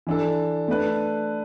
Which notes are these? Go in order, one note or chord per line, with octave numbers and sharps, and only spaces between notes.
E3 D4 A4
A3 D4 B4